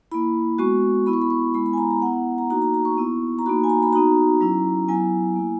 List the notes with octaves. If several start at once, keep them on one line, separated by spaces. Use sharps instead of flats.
A#3 E4 B5
G#3 B3 F#4 C#6
B3 E4 B5
C#6
B5
C#6
G#3 B3 E4 B5
B5
G#5
A#5
A#5
B3 E4 F#5
F#5
A#5
A#3 D#4 F#4 A#5
A#5
A#5
C#6
B3 E4
A#5
A#3 D#4 F#4 B5
G#5
A#5
B5
B3 D#4 F#4 A#5
F#3 C#4 E4
F#3 B3 E4 G#5
A#3 E4